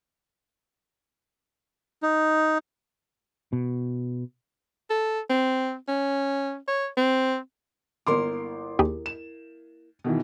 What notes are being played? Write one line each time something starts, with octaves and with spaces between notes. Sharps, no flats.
D#4
B2
A4
C4
C#4
C#5
C4
G1 A#3 E4 A#4 C6 D6
D#2 G4 G#4
E7
B2 D#3 E3